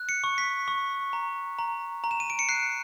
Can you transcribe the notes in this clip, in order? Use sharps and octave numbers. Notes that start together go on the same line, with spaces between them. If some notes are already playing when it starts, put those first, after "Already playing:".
Already playing: F#6
C#7
C#6
B6
C#6
A#5
A#5
A#5
E7
D#7
D7
C#7
F#6 C7